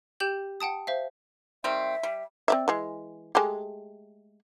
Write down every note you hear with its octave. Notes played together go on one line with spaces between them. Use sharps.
G4 G5 G6 E7 F#7
F#5 G5 A5 D#6
C5 E5 F5
D#3 G3 C4 E5
G3
C4 D5 E5
E3 G#3
G#3 A3 G4